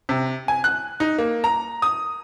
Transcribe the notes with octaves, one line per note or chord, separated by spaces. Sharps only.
C3
G#5
F#6
D#4
A#3
A#5
D#6